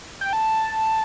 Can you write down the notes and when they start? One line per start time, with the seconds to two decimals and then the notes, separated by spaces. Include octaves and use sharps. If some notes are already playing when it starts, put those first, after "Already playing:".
0.21 G5
0.33 A5